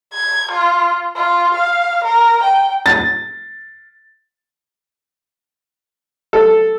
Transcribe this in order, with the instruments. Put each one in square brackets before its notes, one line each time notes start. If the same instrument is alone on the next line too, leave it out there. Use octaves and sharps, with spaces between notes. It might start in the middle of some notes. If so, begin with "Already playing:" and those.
[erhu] G#6
F4
F4
F5
A#4
G5
[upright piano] A6
[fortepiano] A4